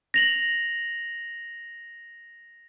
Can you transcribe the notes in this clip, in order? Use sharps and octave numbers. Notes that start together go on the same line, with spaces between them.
A#6 F7 F#7